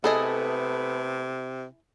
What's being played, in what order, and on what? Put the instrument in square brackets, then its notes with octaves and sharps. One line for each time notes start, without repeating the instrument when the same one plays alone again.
[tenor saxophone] C3 [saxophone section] A3 B3 [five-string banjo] E4 G#4 D#5 [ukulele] A4